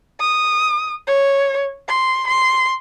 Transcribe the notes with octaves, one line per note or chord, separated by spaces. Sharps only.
D#6
C#5
C6
C6